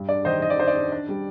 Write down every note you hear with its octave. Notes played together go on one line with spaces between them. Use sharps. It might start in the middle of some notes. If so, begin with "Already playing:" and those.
Already playing: G2
D4 D5
D#3 C5 D#5
D#3 D#5
D5
D4 C5
D5
D4
D4
G3